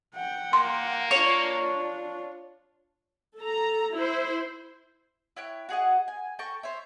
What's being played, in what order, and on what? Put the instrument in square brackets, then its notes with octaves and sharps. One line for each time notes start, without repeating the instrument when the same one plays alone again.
[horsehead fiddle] F#5 G5
[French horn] A#3 [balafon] C6
[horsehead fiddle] D4 F4 [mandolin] C#5
[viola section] A4 A#5
E4 C5
[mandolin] E4 C#5 G5 F#6
F#4 G#4 D#5 F#5
G#5
A4 G5 A#5 C#6
C5 C#5 E5